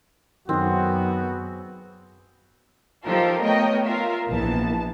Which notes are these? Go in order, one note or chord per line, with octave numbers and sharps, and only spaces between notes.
F#2 D#3 B3 C4 F#4 G#4
F3 D#4 F4 G4 A4 A#4
A3 B3 A#4 C#5 D#5 G5
F4 A#4 E5 F5
A#1 E3 B3 A5